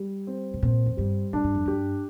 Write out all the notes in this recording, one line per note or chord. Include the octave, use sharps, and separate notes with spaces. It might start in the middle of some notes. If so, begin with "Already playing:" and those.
Already playing: G3
C4
C3
A#2 C4
F2
G2 G3
A2 D4
G2
F2
G2 G4